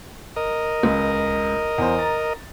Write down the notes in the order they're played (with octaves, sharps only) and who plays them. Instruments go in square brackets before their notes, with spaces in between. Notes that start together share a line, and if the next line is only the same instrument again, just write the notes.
[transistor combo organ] A#4 D#5
[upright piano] C#2
E2 C5
A#5 A6